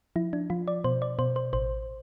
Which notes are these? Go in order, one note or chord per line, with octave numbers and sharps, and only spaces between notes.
F3 E4
D4
F3 F4
D5
B2 C5
D5
B2 C5
C5
A1 C5